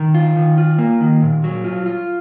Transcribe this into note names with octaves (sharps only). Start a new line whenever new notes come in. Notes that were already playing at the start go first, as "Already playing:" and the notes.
Already playing: D#3
F4
D#3
F4
A#3
D#3
A#2
F#3
F4
F4